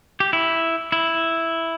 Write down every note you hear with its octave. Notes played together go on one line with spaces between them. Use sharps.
G4
E4
E4